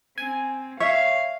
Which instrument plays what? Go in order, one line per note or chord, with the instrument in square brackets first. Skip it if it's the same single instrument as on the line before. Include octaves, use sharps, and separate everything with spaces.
[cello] C4 [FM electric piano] G#5
[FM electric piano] C#5 [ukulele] E5 [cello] F5